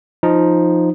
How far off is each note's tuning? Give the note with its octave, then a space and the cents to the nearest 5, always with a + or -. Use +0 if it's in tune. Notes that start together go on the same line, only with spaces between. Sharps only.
F3 +0 D#4 +0